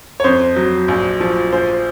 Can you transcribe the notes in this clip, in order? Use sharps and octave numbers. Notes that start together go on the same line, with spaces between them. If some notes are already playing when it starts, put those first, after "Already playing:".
C#5
F2 C5
F#3
A#1
F3
A#1 C5